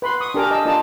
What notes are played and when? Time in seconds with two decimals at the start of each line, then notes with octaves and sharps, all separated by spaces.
0.02 B4 B5 C6
0.20 C#6 D#6
0.34 D4 G4 A4 A#4 G#5 D6
0.51 D#5 A5 E6
0.65 D4 F4 A4 D#5 A5 A#5